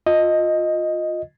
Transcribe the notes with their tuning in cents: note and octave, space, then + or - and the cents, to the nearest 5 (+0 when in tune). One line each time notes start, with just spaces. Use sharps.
F4 +20 D#5 +0